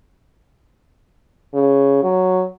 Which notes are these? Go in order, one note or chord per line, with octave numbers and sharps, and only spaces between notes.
C#3
F#3